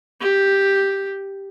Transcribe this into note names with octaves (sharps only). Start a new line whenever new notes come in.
G4